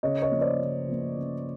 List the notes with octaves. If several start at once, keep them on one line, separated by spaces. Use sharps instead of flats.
C#3 C#5 D#5
C#5 D#5
F3 A#3
C5 D5
C#3
F3 A#3
C#3